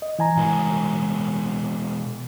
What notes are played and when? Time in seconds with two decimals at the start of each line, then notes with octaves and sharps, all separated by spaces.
0.02 D#5
0.19 E3 G#5 A#5
0.37 B2 G#3 A#4